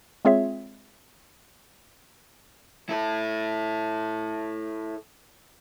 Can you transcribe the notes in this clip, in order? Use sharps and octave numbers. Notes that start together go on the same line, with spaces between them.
G#3 C4 F4 G#4 C#5 E5
E4 A4